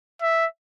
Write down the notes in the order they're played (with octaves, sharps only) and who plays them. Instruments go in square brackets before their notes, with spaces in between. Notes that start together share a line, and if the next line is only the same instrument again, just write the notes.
[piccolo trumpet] E5